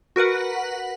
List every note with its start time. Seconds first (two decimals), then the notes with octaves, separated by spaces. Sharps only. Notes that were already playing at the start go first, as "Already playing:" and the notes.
0.16 F#4 A#4 B4 F#5